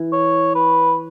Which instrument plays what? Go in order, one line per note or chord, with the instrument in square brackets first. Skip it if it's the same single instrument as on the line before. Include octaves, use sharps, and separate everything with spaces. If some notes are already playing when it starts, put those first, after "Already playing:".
Already playing: [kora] E3
[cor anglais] C#5
B4